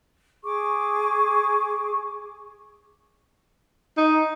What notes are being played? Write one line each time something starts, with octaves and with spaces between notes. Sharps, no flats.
G#4 C#6 D6
D#4